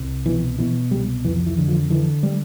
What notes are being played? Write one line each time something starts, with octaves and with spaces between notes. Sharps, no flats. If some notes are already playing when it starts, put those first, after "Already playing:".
Already playing: C2
B2 E3
B2 E3
C2 G3
F2 E3
E3
D3
F3
D3 E3
G3